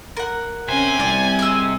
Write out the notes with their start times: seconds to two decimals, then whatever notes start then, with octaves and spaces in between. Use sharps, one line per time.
0.17 A#4 F#5
0.68 C3 C#4 C5 G#5
1.00 C2 D5
1.39 G#4 D#5 E6